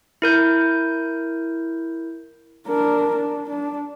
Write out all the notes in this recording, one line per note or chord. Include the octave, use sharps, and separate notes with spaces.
E4 A#4 G6
D4 A#4
D4
D4